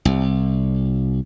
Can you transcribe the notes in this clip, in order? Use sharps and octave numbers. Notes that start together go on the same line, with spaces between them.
C2